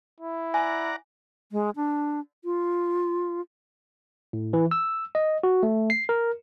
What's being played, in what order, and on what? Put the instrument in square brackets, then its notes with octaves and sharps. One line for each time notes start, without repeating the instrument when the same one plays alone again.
[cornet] E4
[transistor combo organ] D5 F#5 A#5 [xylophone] G#5
[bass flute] G#3
D4
F4
[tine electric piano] A2
E3
E6
D#5
F#4
A3
C7
A#4